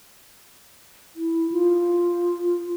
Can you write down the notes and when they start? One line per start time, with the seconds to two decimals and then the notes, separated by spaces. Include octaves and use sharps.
1.16 E4
1.52 F4